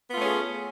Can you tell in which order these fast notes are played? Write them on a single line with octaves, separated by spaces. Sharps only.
B3 F4 A3 C#4 G#4